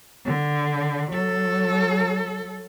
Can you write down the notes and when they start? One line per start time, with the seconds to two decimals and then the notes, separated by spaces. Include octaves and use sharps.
0.26 D3
1.11 F#3 A4